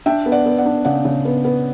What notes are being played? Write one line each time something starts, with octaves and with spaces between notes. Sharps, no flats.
D4 E5 G5
B3
D5 F#5
B3
D5 F#5
D4
C#3 D5 F#5
C#3
B3
B3